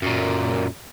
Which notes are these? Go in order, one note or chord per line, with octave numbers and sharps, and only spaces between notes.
F#2 A#2